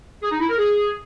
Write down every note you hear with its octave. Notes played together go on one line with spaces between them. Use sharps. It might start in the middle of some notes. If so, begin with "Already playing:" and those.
G#4
D#4
E4
A#4
G#4